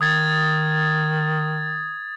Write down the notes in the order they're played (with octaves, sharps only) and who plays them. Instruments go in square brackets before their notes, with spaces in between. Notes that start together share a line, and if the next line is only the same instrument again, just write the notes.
[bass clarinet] D#3 [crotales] D#6 G#6 A6